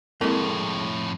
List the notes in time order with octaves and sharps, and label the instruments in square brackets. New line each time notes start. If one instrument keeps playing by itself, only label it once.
[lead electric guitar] F2 A2 [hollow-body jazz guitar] G#3 A#3 [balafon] C4 E4 A4